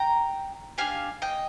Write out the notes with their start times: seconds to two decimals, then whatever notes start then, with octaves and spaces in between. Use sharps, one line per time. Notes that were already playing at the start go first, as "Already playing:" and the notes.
Already playing: G5 A#5
0.78 D4 G4 F5 G#5
1.22 D#5 G5